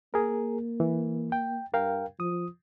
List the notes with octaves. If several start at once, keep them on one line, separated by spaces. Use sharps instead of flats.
A#3 G#4 A#4
E3
G5
G2 A#4 F5 G5
F3 D#6